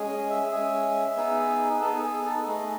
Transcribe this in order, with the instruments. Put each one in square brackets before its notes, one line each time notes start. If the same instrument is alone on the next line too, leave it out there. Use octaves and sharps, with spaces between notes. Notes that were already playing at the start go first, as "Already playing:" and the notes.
Already playing: [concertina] G#3 C#4 G#4
D#5
E5
G#3 C#4 G#4
B3 D#4 G#4
B3 D#4 G#4 A4
G#4
A4
A3 D#4 G#4